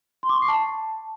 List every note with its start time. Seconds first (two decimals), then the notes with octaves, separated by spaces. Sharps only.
0.23 C6
0.29 D6
0.36 C#6
0.42 C7
0.48 A5